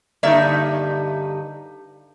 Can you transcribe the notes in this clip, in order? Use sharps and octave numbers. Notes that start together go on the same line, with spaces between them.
G2 D3 A#3 D#4 D5 E5